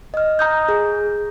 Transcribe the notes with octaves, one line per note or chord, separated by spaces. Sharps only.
D#5 F6
A#5 D#6 G6
G#4